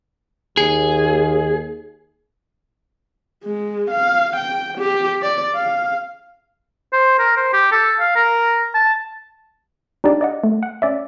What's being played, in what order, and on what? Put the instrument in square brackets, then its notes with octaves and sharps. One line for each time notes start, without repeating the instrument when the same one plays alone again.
[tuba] D#2 [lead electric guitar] G#4
[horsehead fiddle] G#3
F5
G5
G4
D5
F5
[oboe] C5
A#4
C5
G4
A4
F5
A#4
A5
[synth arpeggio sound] D4 D#4 G4 D5
D5 D#5 F#5
A3
F#5
C#4 D5 E5